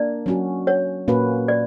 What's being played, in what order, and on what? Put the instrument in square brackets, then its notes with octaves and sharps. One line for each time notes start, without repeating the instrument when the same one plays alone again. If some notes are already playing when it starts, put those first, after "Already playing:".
Already playing: [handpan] A#3 D4 A#4 [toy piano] D5
[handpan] F#3 C#4 F#4
[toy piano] C#5
[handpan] A#2 A#3 C#4 F#4 B4
[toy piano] D5